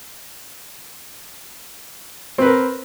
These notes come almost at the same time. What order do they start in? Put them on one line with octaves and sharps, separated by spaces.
C4 B4 A#4